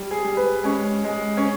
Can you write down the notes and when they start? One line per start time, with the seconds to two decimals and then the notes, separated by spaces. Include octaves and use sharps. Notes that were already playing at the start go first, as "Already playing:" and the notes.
Already playing: G3
0.11 G#4
0.24 G3
0.37 B4
0.63 G#3 C#4
1.04 G#3
1.37 C#4